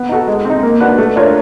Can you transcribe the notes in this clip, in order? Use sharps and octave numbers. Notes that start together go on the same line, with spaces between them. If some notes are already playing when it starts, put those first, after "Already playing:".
Already playing: B3
D#4 F#4 A4
G#3
C4 D#4
A#3
D4 F#4 B4
A3
D4 F4 A#4 C#5